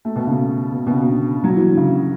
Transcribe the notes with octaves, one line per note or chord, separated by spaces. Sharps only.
A3
B2
C#3
B2
B2
C#3
D3
F#3
E3
D3
C#3